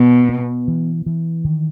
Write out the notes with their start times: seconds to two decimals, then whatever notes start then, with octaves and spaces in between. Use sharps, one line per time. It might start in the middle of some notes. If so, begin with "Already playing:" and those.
Already playing: B2 B3
0.29 B3
0.68 E3
1.06 E3
1.45 D#3